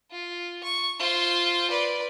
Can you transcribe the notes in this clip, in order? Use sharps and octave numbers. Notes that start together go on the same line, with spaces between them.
F4
C#6
F4 C5
B4 D5